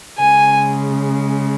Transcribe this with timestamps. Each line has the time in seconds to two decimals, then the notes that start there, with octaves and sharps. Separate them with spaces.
0.18 C#3 G#3 G#5